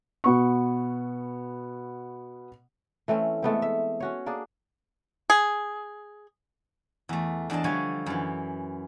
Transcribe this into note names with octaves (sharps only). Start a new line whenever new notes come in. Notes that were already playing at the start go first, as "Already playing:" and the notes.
B2 B3 C#6
E3 A3 C4 C#4
G#3 A3 B3 C4
E5
C#4 F#4 C#5
A#3 D4 G#4
G#4
E2 A3
E2 D4 C5 D#5 A5
D3 F3 G3 C#5 G#5
F#2 E3